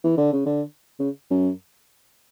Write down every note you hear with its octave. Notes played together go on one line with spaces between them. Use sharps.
E3
D3
C#3
D3
C#3
F#2